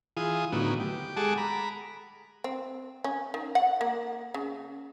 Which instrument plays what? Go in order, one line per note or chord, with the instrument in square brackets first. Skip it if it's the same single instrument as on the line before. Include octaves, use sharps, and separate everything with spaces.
[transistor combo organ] E3 F4 G#4 D#6
A2 D3 D#3 F#3 B3
G4
G#3 G#4 A4 F#5 A5 D6
A#5 B5
[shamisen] C4
C#4
D#3
F#5
A#3
C#3